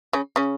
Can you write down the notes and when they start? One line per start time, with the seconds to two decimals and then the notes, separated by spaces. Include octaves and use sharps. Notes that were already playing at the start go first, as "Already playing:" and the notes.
0.13 C#3 C#4
0.36 C#3 C#4